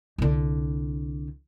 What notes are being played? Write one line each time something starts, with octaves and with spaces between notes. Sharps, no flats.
C2 D3